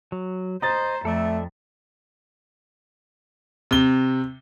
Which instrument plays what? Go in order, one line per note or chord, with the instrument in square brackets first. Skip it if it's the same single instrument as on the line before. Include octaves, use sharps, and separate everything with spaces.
[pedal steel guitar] F#3
[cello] C5 [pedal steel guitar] D#5 [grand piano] A#5 A6
[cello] F2 [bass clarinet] A3 [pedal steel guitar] A4 D5 E5
[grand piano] C3 G7